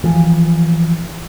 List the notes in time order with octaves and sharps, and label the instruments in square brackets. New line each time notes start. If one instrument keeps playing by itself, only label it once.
[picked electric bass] E3 F3